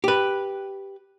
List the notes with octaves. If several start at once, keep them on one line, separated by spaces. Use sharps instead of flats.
G4 B4